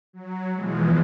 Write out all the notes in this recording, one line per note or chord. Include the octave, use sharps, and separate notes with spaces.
F#3
B2 E3 F3 G#3